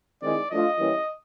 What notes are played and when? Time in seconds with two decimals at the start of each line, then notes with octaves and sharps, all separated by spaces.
0.22 D#3 G#3 C4 E4 G#4 D5
0.51 F3 A3 D4 F4 D#5
0.79 E3 G3 A#3 C#4 E4